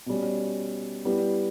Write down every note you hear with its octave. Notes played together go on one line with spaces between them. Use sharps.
B2 G3 C#4
G3 B3 E4 G4